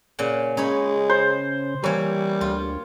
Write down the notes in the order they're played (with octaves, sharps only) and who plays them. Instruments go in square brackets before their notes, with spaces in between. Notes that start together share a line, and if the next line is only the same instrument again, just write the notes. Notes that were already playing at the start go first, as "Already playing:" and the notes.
[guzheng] A#2 C#3 F#5
[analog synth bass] C#3 [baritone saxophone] G#3 [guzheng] D#4 C#5 B5
[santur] C5
[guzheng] E3 A#3 [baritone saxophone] G3 [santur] C#5
[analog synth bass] D2 [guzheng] F4